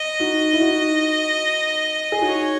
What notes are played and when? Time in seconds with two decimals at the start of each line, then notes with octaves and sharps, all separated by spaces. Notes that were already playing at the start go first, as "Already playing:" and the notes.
Already playing: D#5
0.20 D#4 F#4
0.53 E4
0.61 D#4 F#4
2.12 G#4
2.22 D#4 F#4 C#5